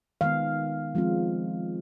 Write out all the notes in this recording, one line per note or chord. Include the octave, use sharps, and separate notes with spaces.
D#3 G#3 B3 F5
F3 G#3 C4 F4